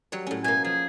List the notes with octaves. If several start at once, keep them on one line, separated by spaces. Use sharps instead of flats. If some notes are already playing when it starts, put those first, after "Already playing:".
F#3 G3 C#5
A2 C#4
B2 A#3 G#5
F3 G#4